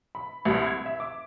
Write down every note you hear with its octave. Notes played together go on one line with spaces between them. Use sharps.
B5
C2
G#6
E5
D6